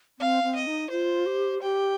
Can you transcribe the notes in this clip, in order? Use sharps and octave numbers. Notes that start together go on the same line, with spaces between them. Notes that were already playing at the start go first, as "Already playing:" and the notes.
C4 F5
C4
D#5
D#4
F4 C5
G4
G4 G5